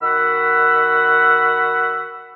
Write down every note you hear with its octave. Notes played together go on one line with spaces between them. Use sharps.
D#3 F#4 F#5 B5 E6